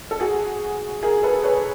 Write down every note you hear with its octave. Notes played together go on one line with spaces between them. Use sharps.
A4
F#4 G#4
G#4 A#4
A4 B4
B4 C#5